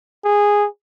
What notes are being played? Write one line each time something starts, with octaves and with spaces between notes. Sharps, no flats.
G#4